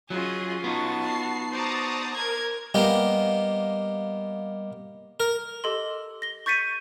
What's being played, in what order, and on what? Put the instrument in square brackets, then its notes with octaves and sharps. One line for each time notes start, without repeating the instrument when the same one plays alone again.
[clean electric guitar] F#3 [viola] C#4 F4 [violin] G#4 D#5
[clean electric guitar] B3 D#4 [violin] F#4 A5
[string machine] C7
[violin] F#4 [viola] C5 D5 [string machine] A5 A#5 D#6
[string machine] A#4 [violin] G#6
[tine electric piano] G3 D#5 F5 [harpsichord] A#3 B3 G4
[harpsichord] A#4
[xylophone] G4 A4 D#5 C6
A#6 G7
C#6 G6 A6 B6 C#7 D#7